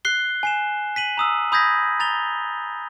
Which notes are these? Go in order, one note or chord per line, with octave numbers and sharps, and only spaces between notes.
F#6 C7 G7
G#5 C7 E7
B6 D#7 F#7
A#5 D#6 E6
B5 D#6 G6 G#6 A#6 B6
A#5 A6 F7 G7